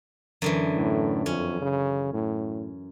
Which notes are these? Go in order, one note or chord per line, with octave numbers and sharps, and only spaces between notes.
F#2 D3 E3
A2
F2 C#4
C#3
A2